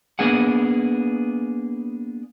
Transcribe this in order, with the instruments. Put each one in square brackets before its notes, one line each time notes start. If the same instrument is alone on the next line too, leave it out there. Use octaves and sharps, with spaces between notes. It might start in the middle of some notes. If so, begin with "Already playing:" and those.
[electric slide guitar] A#3 B3 D4 G#4 F#5